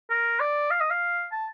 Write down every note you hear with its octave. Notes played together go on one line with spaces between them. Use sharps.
A#4
D5
F5
D#5
F5
A5